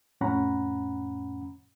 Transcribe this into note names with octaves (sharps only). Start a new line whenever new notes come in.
F2 A2 C#4 F#5 A#5 B5